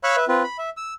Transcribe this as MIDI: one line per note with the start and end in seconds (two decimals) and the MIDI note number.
0.04 0.16 73
0.04 0.16 77
0.04 0.16 83
0.04 0.16 85
0.04 0.16 88
0.04 0.16 90
0.17 0.25 71
0.17 0.25 76
0.28 0.43 60
0.28 0.43 65
0.28 0.43 71
0.43 0.57 83
0.58 0.70 76
0.77 0.94 88